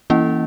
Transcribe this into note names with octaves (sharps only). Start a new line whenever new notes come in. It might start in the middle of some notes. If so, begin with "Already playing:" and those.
E3 A#3 C#4 E4